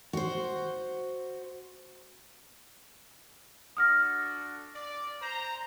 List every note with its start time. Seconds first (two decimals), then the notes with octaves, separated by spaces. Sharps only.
0.13 F#4 C5
3.77 D4 F#4 A4 D#6 F6 A#6
4.75 D5
5.22 C5 A#5